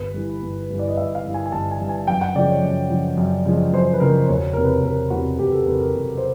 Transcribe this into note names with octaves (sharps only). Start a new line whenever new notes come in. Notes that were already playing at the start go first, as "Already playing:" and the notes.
Already playing: G1 B4
G2 E3
G1
G2 E3
D5
D#5
G1 E5
F5
G2 E3
G#5
G#5
G1 A5
G#5
G2 E3
G#5
F#2 G5
F#5
C#3 F3 G#3 D5
C#5
F#2
C#3 F3 G#3
F#2
C#3 F3 G#3
F#2 C5
B4
C#3 F3 G#3 A#4
E1 C#5
E2 C3 A#4
B4
E1 A#4
E2 C3 F#4
E1 G4
A4
E2 C3 A#4
A#4
E1
C5